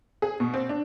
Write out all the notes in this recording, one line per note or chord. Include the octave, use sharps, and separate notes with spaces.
G#4
B2
C4
D4